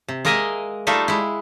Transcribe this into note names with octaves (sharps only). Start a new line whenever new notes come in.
C3
G#3 A#3 A#4 D#5 E5 G#5
G3 A3 D#4 F4 A4 E5
G#3 E4